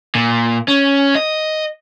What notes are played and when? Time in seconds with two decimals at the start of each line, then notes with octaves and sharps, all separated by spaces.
0.15 A#2
0.68 C#4
1.15 D#5